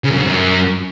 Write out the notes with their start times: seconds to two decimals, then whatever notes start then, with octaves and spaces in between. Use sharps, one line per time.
0.04 C#3
0.10 F#2
0.16 F2
0.21 G#2
0.27 F#2